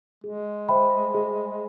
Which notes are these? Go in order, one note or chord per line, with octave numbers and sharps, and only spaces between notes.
G#3 G#4
C5 E5 G5 B5
G#4